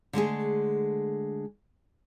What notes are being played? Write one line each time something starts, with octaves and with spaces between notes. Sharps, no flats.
D3 G#3 A3 G#4